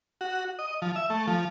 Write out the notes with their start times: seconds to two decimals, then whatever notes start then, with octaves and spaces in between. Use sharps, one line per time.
0.21 F#4
0.59 D#5
0.82 F3
0.96 E5
1.10 A3
1.27 F3